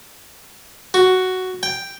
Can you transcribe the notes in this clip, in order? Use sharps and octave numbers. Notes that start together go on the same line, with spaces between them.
F#4
G5